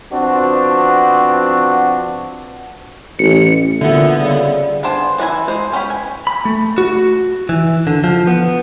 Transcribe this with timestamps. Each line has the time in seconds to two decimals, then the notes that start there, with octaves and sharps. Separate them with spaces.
0.13 F3 B3 C4 D4 F#4
3.19 A1 C#7
3.81 A#2 D3 B3 E5
4.17 C#3 G3
4.83 B3 D4 C5 G#5
5.18 E3 D4 E4 B4 G#5
5.48 G#3 C5
5.72 B3 C#4 C5 G5 B5
5.90 G#5
6.27 B5
6.45 A3
6.78 F#4
7.49 E3
7.87 D3
8.04 F3
8.27 B3